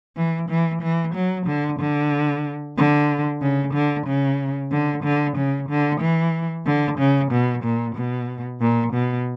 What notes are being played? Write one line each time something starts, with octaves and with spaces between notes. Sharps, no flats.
E3
E3
E3
F#3
D3
D3
D3
C#3
D3
C#3
D3
D3
C#3
D3
E3
D3
C#3
B2
A#2
B2
A#2
B2